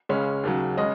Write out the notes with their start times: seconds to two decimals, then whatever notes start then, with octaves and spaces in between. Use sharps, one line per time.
0.09 C#2 C#3 G#3 C#4
0.44 D#2 C#3 F#3
0.77 C#3 G#3 C#4 D#5